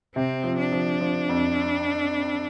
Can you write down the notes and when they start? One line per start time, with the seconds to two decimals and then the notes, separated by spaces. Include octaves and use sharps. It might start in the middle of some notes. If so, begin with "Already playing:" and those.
0.15 C3 C4
0.44 F3
0.58 D4
0.72 F3
1.01 F3
1.29 F2